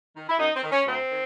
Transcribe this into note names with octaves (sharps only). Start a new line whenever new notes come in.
D#3
E4
F#2 D#4
C4
D#3
C#4
D2 C4
D#3